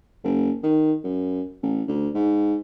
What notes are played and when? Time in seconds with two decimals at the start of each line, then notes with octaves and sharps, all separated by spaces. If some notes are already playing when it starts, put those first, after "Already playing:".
0.24 F#1
0.63 D#3
1.04 F#2
1.62 A1
1.88 D2
2.14 G#2